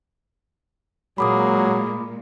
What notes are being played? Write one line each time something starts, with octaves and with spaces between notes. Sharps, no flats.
A#2 F#3 G#3 A#3 G#4 B5 D6 D#6